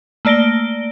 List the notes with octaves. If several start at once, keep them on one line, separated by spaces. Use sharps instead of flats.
A3 A#3 D5 A#6 D7 G7